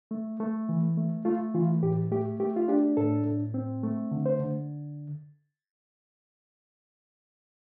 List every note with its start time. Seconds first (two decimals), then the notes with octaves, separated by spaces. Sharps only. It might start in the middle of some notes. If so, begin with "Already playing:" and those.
0.11 A3
0.40 A3
0.69 E3
0.97 A3
1.25 A3 F4
1.54 E3 F4
1.83 A2 G4
2.11 A3 G4
2.40 A3 G4
2.56 F4
2.68 D4 G4
2.97 A2 A4
3.26 A2
3.54 C4
3.83 A3
4.11 D3
4.26 C5
4.40 D3